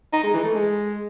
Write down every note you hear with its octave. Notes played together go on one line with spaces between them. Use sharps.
D#4
G#3
E3
A3
G#3